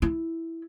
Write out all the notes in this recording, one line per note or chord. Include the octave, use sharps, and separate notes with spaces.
E4